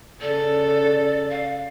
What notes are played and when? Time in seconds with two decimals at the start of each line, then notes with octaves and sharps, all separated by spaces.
0.20 C#3 A4 D5
1.29 F5